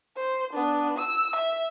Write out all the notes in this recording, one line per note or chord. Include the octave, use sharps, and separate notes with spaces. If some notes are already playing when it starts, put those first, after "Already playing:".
C5
B3 D4
E6
E5